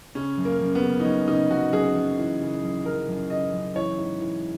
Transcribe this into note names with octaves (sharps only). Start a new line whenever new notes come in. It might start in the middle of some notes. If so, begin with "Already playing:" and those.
C#3 C#4
F#2
A#3
F#2
B3
C#3
D#4
F#2 C#4
C#3 D#4
F#2 F#4
F#2 G#4
F#2
E3
C#3
F#2
F#2 A#4
F#2
C#3 D#5
F#2
E3 C#5
G#2
E3